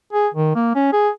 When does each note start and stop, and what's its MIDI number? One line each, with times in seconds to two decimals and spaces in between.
0.12 0.28 68
0.34 0.52 51
0.56 0.75 58
0.75 0.92 61
0.93 1.09 68